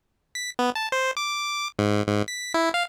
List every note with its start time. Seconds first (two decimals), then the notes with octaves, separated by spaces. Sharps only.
0.35 B6
0.59 B3
0.75 A5
0.92 C5
1.17 D6
1.79 G#2
2.07 G#2
2.28 B6
2.54 E4
2.74 F5